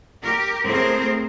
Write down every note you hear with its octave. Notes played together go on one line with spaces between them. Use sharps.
G4 A#4
A2 A3 C4 G#4 A#4 C5